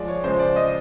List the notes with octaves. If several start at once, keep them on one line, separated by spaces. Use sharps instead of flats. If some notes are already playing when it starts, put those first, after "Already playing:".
Already playing: F3 G#3 D5
C#5
C#3 F3 G#3 C5
D5
D#5